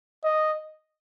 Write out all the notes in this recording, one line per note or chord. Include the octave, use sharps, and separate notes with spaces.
D#5